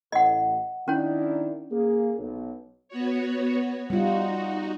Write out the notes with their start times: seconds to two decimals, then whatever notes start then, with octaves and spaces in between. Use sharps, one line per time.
0.12 A1 D#5 F#5
0.88 D#3 C#4 D4 E4 C#5
1.71 A#3 G#4
2.18 B1
2.89 B3 F#4 C#5
3.90 G3 D#4 F4 F#4